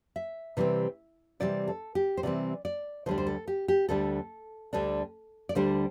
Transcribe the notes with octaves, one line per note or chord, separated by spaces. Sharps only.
E5
C3 E3 G3 C4
C3 E3 G3 C4 D5
A4
G4
C5
C3 E3 G3 C4 D5
D5
D2 D3 G3 D4 C5
C5
A4
G4
G4
D2 D3 G3 D4 A4
D2 D3 G3 D4
D5
D2 D3 G3 D4 C5